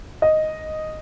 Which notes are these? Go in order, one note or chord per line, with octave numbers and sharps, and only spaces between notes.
D#5